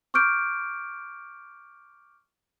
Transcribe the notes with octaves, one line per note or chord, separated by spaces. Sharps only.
C#6 D6 F6 G6 D7